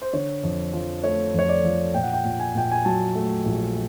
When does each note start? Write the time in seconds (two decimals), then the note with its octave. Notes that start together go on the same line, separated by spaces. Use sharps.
0.02 C5
0.13 D3 C#5
0.43 F2
0.73 F3
1.04 A3 C#5
1.34 F2 C#5
1.49 D5
1.64 F3
1.94 A#2 G5
2.03 F#5
2.13 G5
2.24 A#2
2.40 G#5
2.55 A#2 G5
2.72 G#5
2.85 F#3 A5
3.15 A3
3.45 A#1